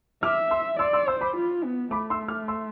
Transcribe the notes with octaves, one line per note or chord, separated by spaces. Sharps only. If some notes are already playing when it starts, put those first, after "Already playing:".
E5 D6 F6
C6 E6
D5 C6 E6
C6 E6
C5 C6 E6
B5 D6
F4
B3
A3 B5 D6
C6 E6
D6 F6
C6 E6